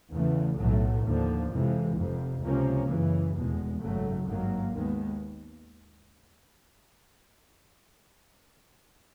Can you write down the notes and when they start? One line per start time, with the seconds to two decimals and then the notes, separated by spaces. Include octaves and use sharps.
0.12 E2 C#3 E3 A3
0.58 B1 A2 F#3 A3
1.04 D#2 D3 F3
1.50 F2 C3 E3 G#3
1.96 F1 F2 C3
2.42 C#2 C3 F3 A#3 C#4
2.88 F#2 C#3 E3
3.34 F1 E2 B2 G#3
3.80 G#1 F#2 C#3 F#3 A3
4.26 G#1 G2 D#3 F#3 A#3
4.72 D#2 D#3 G#3 B3